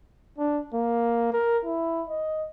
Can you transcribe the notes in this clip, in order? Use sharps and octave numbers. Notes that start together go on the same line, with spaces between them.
D4
A#3
A#4
E4
D#5